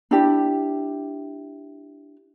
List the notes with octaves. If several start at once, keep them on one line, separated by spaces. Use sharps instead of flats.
D4 E4 G4